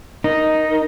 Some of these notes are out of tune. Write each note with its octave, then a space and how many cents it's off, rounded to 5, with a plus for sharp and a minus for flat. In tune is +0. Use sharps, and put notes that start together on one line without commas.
D#4 +0 A#4 +0